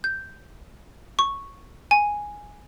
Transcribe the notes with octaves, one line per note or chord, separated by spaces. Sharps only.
G6
C#6
G#5